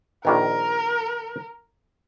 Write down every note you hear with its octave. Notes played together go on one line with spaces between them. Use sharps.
A#1 D#3 E3 A#4